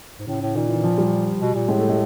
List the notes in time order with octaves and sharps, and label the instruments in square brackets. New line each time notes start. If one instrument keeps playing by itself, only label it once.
[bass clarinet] G#2
[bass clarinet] A2 [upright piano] C#3
[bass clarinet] A2
[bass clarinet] A#2 [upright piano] D#3
[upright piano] E3
F3
G3
[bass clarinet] B2
A#2
[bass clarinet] A2 [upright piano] G#3
[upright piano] A3
G#3